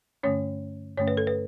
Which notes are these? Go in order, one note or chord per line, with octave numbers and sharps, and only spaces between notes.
G2 D3 A3 C#4 C#5
G2 D3 A3 C#4 C#5
B4
A4
B4